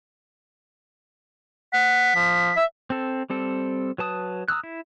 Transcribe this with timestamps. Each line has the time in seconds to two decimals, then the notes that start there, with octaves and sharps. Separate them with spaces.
1.73 F#5 B6
2.15 F3
2.56 E5
2.90 C4 A4
3.30 G3 C4 A4
3.98 F#3 B4 A5 D#6
4.48 A#5 D#6 E6 F#6
4.64 E4